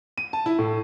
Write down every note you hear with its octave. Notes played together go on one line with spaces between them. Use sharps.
D#7
A5
E4
A2